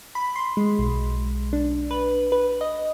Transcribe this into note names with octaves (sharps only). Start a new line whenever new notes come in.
B5
C6
G#3
B1
D4
B4
B4
D#5